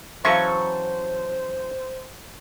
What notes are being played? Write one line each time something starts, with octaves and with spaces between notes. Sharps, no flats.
E3 F#3 C#4 A4 C5 E5 F5 C#6